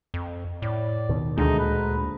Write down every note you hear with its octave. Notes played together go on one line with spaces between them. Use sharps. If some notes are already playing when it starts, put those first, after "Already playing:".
F2
A2 D5
D#2 B2 D#3
D2 D3 G#3 D#4
A#2 B4